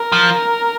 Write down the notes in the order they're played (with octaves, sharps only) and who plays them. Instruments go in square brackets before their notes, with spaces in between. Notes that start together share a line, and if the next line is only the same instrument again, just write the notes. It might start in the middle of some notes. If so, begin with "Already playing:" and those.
Already playing: [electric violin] A#4
[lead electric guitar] F3